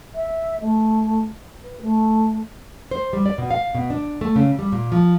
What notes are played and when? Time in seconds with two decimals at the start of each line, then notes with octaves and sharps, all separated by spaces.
0.14 E5
0.60 A3
1.63 B4
1.81 A3
2.91 C5
3.13 G3
3.26 D5
3.38 B2
3.51 F5
3.75 B2
3.90 D4
4.21 A3
4.36 C#3
4.59 G3
4.72 A#2
4.92 F3